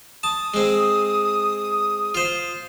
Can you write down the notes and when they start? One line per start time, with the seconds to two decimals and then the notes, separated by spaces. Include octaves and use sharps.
0.23 A5 D#6
0.54 G#3 C4
2.15 F4 C5